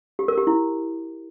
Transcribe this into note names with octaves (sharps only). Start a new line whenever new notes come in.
G4
A#4
G4
E4